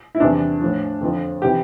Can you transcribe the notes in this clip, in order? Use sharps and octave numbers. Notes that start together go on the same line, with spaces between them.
E4
E2 C3 E3 D4
A2 F3
F2 D3 F3
C3 E3 G4